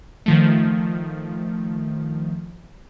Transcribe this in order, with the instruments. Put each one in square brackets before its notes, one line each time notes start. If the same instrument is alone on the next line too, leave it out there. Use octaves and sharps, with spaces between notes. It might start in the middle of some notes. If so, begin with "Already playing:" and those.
[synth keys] D#3 F3 A3